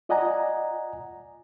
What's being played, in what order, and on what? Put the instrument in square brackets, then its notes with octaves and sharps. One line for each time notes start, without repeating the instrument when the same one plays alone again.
[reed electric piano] F4 D5 D#5 F#5 G#5 A#5